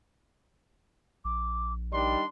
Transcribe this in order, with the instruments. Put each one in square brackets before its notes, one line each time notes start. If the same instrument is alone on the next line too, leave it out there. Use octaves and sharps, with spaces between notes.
[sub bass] A#1 [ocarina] D6
[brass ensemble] D#3 G3 [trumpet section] D4 C6 [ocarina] D#5